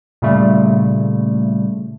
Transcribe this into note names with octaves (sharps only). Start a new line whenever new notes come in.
A#2 C#3 G3 A3